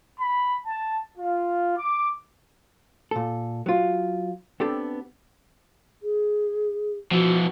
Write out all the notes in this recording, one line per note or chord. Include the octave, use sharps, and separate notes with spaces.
B5
A5
F4
D6
A#2 A4
F#3 F4
B3 C4 D4 G4 A4
G#4
B2 E3 F3 F#4